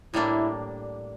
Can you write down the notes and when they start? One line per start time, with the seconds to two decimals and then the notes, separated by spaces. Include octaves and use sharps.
0.14 A2 G3 A#3 D4 E4